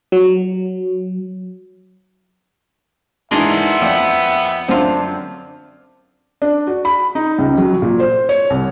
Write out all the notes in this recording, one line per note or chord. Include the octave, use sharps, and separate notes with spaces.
F#3
G#2 E3 B3 D4 G#4 A#4 E5 C6
F2 F3 D5 E6
F#2 D3 C4 D4 F4
D4
F#4
B5
D#4
C#2
F#3
A#2
C5
C#5
C2